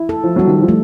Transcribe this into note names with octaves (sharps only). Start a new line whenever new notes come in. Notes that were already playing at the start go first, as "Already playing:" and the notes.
Already playing: E4
A4
F3
F#3 G3
D#3 F3
F3
A3